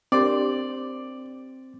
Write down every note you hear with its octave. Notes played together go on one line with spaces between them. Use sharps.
C4 D4 G4 A#4 D5 C6